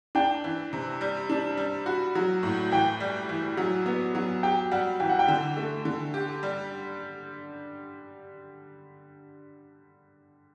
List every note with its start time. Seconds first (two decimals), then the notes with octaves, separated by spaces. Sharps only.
0.15 D4 G5
0.44 E3
0.73 C3
1.01 G3
1.29 D4
1.57 G3
1.86 F#4 B5
2.15 F#3
2.43 A2
2.72 E3 G5
3.00 G3
3.29 E3
3.57 F#3
3.86 B3
4.15 F#3
4.43 G4 G5
4.71 G3 F#5
5.00 E3 G5
5.09 F#5
5.19 G5
5.28 D3
5.57 A3
5.85 D3
6.14 G4
6.43 G3